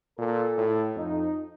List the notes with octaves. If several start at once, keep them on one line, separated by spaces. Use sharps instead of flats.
A#2 A4
A2
F2 D#4